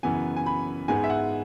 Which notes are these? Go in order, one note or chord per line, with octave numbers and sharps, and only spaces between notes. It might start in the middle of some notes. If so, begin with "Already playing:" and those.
F#2 C#3 E3 B3 G#5
G#5
B5
G#2 G#3 B3 G#5
E5
F#5